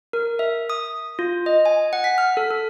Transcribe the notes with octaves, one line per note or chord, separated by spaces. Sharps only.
A#4
E5
D#6
F4
D#5
G#5
F#5
B6
F6
A4
A4